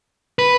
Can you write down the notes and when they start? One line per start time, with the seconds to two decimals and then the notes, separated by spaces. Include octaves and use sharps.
0.39 B4